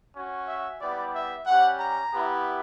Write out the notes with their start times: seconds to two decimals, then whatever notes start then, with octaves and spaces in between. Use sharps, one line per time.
0.16 C#4 F#4
0.48 E5
0.81 G3 B3 E4 G4 D5
1.14 E5
1.47 G3 C#4 G4 F#5
1.80 A#5
2.13 B3 E4 G4